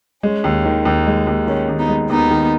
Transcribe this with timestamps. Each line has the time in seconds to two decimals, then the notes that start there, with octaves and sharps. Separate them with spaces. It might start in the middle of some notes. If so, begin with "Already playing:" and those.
0.23 G#3 C#4
0.44 D#2
0.65 D#3
0.85 D#2
1.07 G#3
1.27 D#2
1.47 D#3 C#4
1.69 D#2
1.79 B3 D#4
1.89 G#3
2.10 D#2 B3 D#4
2.31 D#3